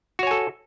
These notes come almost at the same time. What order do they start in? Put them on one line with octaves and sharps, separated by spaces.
F#4 C#5 G#5 A4